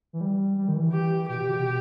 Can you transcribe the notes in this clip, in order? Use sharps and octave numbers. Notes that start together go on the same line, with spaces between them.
E3
G3
G3
D#3
E3
G4
B2 G4
B2
C#3
B2